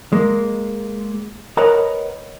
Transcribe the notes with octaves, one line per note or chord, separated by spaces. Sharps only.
G#3 A#3
A#4 B4 C#5 D#5 F#5 A#5